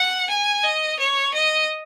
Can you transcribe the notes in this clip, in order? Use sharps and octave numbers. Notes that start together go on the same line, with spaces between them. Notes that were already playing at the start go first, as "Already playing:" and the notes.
Already playing: F#5
G#5
D#5
C#5
D#5